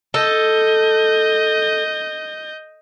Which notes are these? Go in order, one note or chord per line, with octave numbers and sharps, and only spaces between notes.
A4 D#5 G6